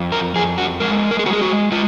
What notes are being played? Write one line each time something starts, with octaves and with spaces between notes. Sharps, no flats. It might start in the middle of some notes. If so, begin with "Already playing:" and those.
Already playing: F2
A#4
F2 G#4
F#4
G#3 A#4
A#4
G#4
G#3 F#4
G#4
F#4
G#3 F4